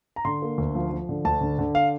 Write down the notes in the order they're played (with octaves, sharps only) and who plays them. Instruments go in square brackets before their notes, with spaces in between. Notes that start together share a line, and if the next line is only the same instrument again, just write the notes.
[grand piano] A#5
D3 C6
A#3
D2
F3
F3
D3
D2 A5
D3
D3
F5